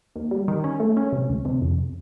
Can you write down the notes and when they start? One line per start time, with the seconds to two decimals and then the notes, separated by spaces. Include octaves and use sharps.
0.16 D#2
0.31 G3
0.48 D#3
0.64 C#4
0.80 A3
0.97 C#4
1.13 C3
1.29 D2
1.45 C3
1.61 F2